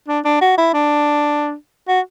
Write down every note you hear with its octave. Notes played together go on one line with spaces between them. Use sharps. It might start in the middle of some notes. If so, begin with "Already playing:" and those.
D4
D4
F#4
E4
D4
F#4